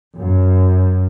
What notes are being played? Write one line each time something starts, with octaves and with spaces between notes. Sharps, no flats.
F#2